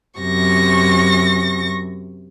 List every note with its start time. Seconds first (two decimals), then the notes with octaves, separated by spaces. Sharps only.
0.20 F#2 C3 C#6 A#6